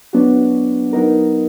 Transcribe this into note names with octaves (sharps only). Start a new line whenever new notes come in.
F#3 B3 D4 F#4
F#3 B3 D#4 A#4